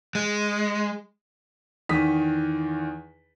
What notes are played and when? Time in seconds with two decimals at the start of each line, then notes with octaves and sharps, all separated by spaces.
0.15 G#3
1.89 E2 D#3 D#6 B6